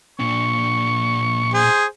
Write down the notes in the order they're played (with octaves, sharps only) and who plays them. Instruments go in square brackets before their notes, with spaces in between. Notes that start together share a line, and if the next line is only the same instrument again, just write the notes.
[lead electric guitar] A#2 D4 [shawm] C#6
[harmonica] G#4 [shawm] C5